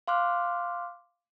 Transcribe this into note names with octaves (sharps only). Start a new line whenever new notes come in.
F5 C6 D6 F6 F#6